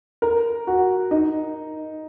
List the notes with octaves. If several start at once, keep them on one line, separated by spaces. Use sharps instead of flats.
A#4
F#4
D#4